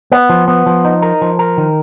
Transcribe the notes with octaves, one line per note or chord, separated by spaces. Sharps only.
B3
F3
B3
F3
D#4
A#4
F3
A#4
D#3